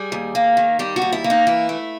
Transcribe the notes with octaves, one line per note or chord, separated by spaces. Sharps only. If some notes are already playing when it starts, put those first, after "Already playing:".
Already playing: G3 G#4
D#2
A#3
D#3
G3 G4
F#4
D#2
E4
A#3
D#4
E3 E4
A3